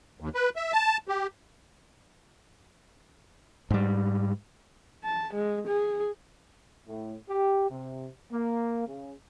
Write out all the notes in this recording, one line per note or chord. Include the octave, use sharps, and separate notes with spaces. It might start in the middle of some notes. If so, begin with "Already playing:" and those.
D#2
B4
E5
A5
G4
G#2 G3
A5
G#3
G#4
A2
G4
C3
A#3
C#3